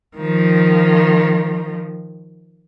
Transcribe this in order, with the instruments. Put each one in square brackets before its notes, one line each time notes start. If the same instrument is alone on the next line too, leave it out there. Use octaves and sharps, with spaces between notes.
[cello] D#3 F3